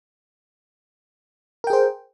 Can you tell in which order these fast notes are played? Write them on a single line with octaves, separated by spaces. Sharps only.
A#4 G5 G#4 C5